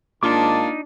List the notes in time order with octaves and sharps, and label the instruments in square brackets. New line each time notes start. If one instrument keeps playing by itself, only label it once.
[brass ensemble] G#2 D#3 A5 [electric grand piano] A#3 F4 [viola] D4 [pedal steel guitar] D#4 D6